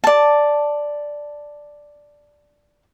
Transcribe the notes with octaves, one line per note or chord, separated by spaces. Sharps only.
D5 A5